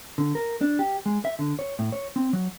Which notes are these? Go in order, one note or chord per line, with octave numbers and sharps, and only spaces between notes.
D3
A#4
D4
G4
G#3
E5
D3
C#5
A2
C#5
C4
F#3